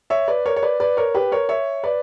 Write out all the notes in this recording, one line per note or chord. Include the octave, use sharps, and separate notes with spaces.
C#5 E5
B4 D5
A#4 C#5
C#5
B4 D5
B4 D5
A#4 C#5
G4 B4
A#4 C#5
C#5 E5
B4 D5